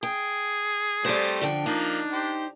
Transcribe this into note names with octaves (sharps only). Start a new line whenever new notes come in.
G#4 G5
G3 A3 C4 C5 D5
F2 D3 G5
F3 A#3 D4 D#4
G4 C5